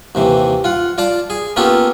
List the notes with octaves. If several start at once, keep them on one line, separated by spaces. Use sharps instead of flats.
D#2 C3 E3
F4 F#5
F4 D5 A5
G#4
A#3 B3 C#4 F4 G4 A4